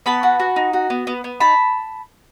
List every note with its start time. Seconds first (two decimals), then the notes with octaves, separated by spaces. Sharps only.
0.06 B3 A5 B5
0.23 F#4
0.40 F#4
0.56 D#4
0.73 F#4
0.90 B3
1.07 B3
1.24 B3
1.40 D#4 A5 B5